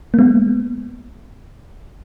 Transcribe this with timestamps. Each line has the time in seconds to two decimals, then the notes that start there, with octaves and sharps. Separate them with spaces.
0.14 A#3
0.19 G#3 B3